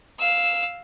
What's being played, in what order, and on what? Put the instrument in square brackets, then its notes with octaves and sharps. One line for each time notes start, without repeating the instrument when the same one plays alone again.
[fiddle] F5 E6